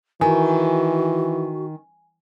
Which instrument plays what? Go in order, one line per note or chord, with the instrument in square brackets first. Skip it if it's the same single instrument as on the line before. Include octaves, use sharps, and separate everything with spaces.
[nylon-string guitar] D#3 [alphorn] E3 [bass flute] F#4 [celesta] G#5